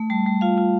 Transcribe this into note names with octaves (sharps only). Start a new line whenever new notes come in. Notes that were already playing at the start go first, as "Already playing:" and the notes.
Already playing: A3
G3 A5
G3
F4 F5
F4